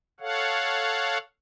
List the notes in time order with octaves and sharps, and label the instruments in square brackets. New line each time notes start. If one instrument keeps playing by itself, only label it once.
[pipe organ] A4 C#5 F5 F#5